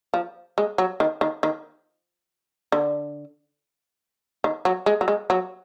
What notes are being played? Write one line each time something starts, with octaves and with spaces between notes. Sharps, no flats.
F3
G#3
F#3
D#3
D#3
D#3
D3
D#3
F#3
G#3
F#3
G#3
F#3